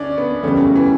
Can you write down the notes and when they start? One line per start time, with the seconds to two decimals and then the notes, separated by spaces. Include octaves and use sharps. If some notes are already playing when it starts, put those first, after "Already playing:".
Already playing: D2 C#4 D4
0.18 B3
0.43 F#1 E2 C#3 G3 A3 C#4
0.76 E3